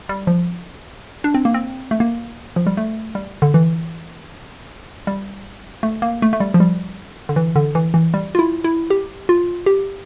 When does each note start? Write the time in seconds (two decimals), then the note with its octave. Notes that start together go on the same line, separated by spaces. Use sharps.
0.09 G3
0.27 F3
1.24 D4
1.34 C4
1.45 A#3
1.54 C4
1.91 A3
2.00 A#3
2.56 F3
2.67 G3
2.77 A3
3.15 G3
3.42 D3
3.54 E3
5.07 G3
5.83 A3
6.02 A#3
6.22 A3
6.33 A3
6.40 G3
6.54 F3
6.60 G3
7.29 D3
7.36 E3
7.56 D3
7.75 E3
7.94 E3
8.14 G3
8.35 F4
8.39 E4
8.64 E4
8.90 G4
9.29 F4
9.66 G4